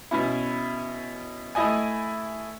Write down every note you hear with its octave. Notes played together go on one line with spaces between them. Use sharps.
B2 C#4 E4
A3 E4 D#5 G#5